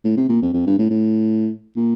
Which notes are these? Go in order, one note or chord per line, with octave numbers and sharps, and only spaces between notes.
A2
C3
A#2
F2
F2
G2
A2
A2
A#2